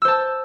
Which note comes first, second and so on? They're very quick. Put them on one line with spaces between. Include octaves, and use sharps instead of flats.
E6 C5 A5